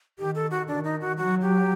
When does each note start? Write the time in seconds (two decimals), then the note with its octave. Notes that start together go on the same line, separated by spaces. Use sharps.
0.18 D#3 G4
0.35 A4
0.51 F#4
0.68 D#3 D4
0.84 D#4
1.01 F#4
1.17 F#3 F#4
1.42 G4